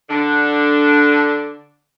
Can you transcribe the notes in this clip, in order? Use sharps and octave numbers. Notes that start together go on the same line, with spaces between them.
D3 D4